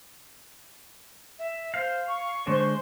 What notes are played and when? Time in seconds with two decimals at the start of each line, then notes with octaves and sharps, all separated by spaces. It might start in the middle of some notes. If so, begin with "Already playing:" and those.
1.39 E5
1.74 C5 F5
2.07 C#6
2.47 D3 G#3 D4 C5